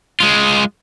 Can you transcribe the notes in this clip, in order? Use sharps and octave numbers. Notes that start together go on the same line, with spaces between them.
G#3 F4